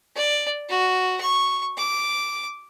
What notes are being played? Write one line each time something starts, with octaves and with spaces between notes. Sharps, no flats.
D5
F#4
C#6
D6